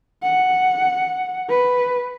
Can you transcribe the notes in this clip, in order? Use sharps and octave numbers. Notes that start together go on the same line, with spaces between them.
F#5
B4